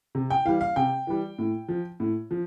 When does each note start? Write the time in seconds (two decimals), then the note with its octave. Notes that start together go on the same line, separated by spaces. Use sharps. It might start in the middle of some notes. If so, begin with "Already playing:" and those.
0.15 C3
0.30 G5
0.45 E3 G3 F5
0.61 F5
0.76 C3 G5
1.07 E3 G3
1.38 A2
1.68 F3
2.00 A2
2.31 F3